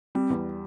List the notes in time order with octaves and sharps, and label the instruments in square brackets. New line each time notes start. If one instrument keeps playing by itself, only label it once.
[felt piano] G3 [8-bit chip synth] C4
[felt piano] E2